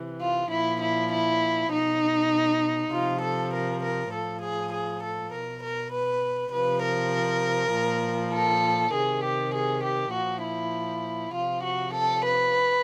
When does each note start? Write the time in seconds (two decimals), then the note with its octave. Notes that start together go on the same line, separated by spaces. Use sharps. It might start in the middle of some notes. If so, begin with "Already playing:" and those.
Already playing: C3 E3
0.21 F4
0.51 A#2 F3 E4
0.81 E4
1.12 E4
1.71 B2 D#4
2.92 C3 F3 F4
3.22 A4
3.52 A#4
3.82 A#4
4.12 A2 F3 A4
4.42 G#4
4.73 G#4
5.03 A4
5.32 B2 A#4
5.63 A#4
5.92 B4
6.52 C3 F3 B4
6.83 A#4
7.73 A#2 F3
8.33 A4
8.93 C3 D#3 G#4
9.23 G4
9.54 G#4
9.83 G4
10.13 A#2 F3 F#4
10.43 E4
11.34 C3 F3 F4
11.63 F#4
11.93 A4
12.23 B4